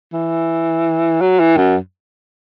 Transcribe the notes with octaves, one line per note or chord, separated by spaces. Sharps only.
E3
F#3
E3
F#2